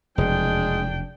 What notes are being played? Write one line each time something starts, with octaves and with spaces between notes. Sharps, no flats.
F1 E2 B2 G#3 D4 G5